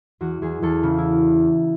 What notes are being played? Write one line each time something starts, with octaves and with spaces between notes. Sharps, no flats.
E2 F#4
E2 G#4
E2 A4
C#3
E4